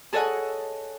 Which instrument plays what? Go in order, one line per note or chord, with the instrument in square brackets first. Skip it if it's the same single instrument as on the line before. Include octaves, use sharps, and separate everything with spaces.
[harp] G#4 A4 C#5 D#5 F#5 G#5